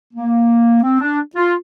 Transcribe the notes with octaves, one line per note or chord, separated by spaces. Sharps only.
A#3
C4
D4
F4